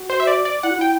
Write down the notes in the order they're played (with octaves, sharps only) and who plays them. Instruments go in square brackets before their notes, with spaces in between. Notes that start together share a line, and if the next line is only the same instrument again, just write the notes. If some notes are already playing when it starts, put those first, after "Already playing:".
Already playing: [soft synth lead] F#4
[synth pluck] C5
E5
D5
D5
[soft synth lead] E4 [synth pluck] F#5
[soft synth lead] F#4
[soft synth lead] E4 [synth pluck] G5